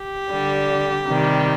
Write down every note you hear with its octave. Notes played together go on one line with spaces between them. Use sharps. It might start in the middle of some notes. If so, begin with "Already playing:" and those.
Already playing: G4
D3 G3
C3 D#3 G3